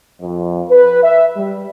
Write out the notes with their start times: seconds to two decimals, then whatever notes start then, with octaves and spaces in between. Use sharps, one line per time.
0.20 F2
0.69 B4
1.02 E5
1.37 G3